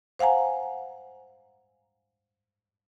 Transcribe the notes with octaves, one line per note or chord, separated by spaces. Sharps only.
C5 F5 F#5 G#5 A#5